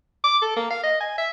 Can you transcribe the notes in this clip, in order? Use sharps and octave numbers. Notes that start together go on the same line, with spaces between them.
D6
A4
A#3
F5
D#5
G#5
E5